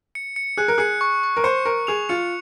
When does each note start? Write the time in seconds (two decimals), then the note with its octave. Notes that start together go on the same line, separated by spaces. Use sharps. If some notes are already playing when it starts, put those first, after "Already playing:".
0.15 C#7
0.36 C#7
0.57 G#4 F#6
0.68 A#4
0.78 G#4 C#7
1.01 C#6
1.23 C#6
1.37 A#4
1.44 C5 C#7
1.66 A#4 C#6
1.87 G#4 F7
2.09 F4 C#7